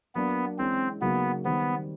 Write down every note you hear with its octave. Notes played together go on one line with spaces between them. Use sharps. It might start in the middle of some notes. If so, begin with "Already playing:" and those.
F#3 A#3 B3 D4
E3 G#3 C4 C#4
C#3 F#3 A#3 B3 D#4
D#3 G3 B3 C4